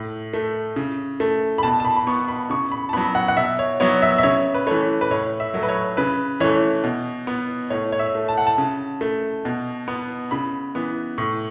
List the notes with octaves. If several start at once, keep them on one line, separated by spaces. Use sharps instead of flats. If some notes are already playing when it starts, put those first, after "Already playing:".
Already playing: A2
A3
C#3
A3
B5
B2 A5
A5
B5
B5
B3 C#6
B5
C#3 C#6
B5
A5
F#3 B3 B5
F#5
F#5
B2 E5
C#5
F#3 B3 C#5
E5
E5
C#3 C#5
B4
E3 A3 C#5
B4
A2 C#5
E5
F#3 A3
B4
C#5
C#3 B4
E3 A3 C#5
B2
B3
A2 C#5
C#5
E5
A3
A5
F#5
A5
C#3
A3
B2
B3
C#3 B5
E3 B3
A2 C#6